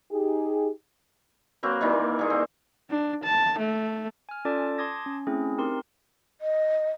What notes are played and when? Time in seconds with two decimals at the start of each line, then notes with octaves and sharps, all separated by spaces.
0.12 D#4 G4 G#4
1.63 F#3 A#3 C4 B4
1.81 D#3 E3 G3 A#3
2.19 G3 G#4 C#6
2.30 C4
2.90 D4
3.24 A5
3.59 A3
4.29 G#5 F6
4.45 C#4 F4 A4 D5 A5 D6
4.78 A5 C6 D6 D#6 G#6 A#6
5.06 C#4
5.27 A3 C4 C#4 E4 G#4
5.58 C4 D#4 G4 A#4 C6
6.41 D#5